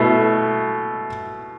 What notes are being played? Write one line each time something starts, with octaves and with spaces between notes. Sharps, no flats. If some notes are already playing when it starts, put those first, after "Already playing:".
Already playing: B2 A3 E4